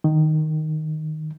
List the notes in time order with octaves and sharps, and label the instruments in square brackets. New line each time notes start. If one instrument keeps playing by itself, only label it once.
[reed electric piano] D#3